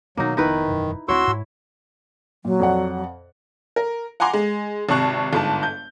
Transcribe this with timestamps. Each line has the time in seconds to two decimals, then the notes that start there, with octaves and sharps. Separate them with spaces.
0.17 B2 D#3 F#3 A#3 B3 D#4
0.37 F1 E2 D#3 B3 D#4 E4 B4
0.68 E1 F#2
1.08 D2 C4 E4 F#4 C#5 C6 E6
1.27 G#2
2.45 A#2 F#3
2.60 F2 D5 F#5
3.76 A#4
4.20 F#5 G#5 A#5 C6 D6
4.33 G#3
4.89 G#1 C3 A5 C#6 F#6
5.33 G1 G#2 A5
5.63 G6